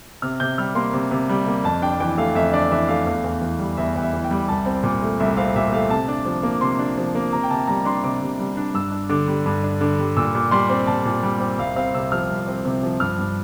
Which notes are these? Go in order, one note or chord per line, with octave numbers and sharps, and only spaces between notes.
C3 F6
C3 G6
G3 F6
A#3 C6
C3
C3
G3
A#3
F2 A5
D4 G5
E3 G5
A3 F5
F2 E5
D4 D5
E3 E5
A3 F5
E2 F5
E2
E3
G3
E2 E5
E2
E5
E3
G5
G3
C2 A5
C4
A#2
A3
C2 E5
C4 F5
A#2 E5
A3 F5
C3 A5
D4
F3
A#3
C3 C6
D4
F3
A#3
C3 A#5
G5
C3 A5
G3 A#5
D4 C6
C3 D6
C3
G3
D4
G2 E6
D4
D3 D6
G3
G2
D4
D3 D6
G3
A#2 E6
A#2
G3 C6
C4
A#2 A5
A#2
G3
C4
C2 F5
C4 F5
C3 E6
F3 F6
C2
C4
C3
F3
G2 F6
G2